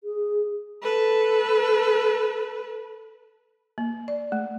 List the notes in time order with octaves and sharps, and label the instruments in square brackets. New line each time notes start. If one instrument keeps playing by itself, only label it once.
[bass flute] G#4
[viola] A4 B4
[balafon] A#3
D5
A3